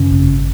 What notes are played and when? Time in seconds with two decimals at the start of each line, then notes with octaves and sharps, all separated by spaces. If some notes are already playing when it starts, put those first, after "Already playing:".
Already playing: F#2 C#3 C#4
0.11 G#1